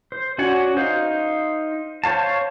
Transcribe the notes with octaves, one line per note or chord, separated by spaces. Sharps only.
C5
C#4 F#4 D5 F#5 G#5
D#4 C5 F5
C5 C#5 F5 A5